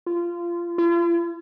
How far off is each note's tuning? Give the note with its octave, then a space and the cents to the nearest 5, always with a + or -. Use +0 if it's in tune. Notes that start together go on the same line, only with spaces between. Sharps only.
F4 -20
F4 -45